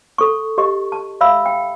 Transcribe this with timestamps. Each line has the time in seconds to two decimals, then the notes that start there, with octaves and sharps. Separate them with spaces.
0.18 A4 C#6
0.58 G4 D#5 C#6
0.92 A5
1.21 E5 F5 B5 E6
1.46 G5